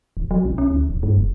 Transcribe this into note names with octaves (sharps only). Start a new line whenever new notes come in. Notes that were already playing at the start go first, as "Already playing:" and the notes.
D#1
F#3
B1
C#4
D2
D1
G2
F1